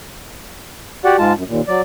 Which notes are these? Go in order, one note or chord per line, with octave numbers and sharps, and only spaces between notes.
F#4 G4 D5 F#5
G#2 G#3 F4 A5
F#2
D#2 A#2
F#3 D5